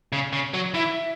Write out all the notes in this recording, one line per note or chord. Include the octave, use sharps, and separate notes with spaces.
C#3
C#3
F#3
E3 E5